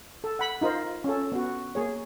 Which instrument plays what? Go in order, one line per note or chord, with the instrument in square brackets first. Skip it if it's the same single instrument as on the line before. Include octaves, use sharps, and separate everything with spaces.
[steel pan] A4
F#5 B5
D#4 F4 A#4 C5
C#4 A4
B3 F#4
A#3 G#4 C#5